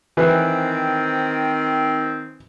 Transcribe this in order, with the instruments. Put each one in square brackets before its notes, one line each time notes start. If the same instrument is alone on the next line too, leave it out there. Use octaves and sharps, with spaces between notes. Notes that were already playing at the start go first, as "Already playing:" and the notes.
[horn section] D#3 C4 [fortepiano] E3 B4